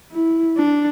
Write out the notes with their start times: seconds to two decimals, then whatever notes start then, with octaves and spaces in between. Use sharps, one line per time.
0.12 E4
0.57 D4